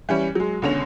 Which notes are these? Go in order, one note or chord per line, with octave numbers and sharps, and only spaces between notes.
E3 G3 C#4
F#3 G#3
C#2 B2 D3 C#4 A#6 F7